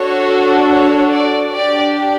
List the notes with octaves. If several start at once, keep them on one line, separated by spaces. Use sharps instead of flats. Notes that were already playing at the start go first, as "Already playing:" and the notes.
Already playing: D4 F#4 A4 C#5
C#5
D5
D4 G4 D5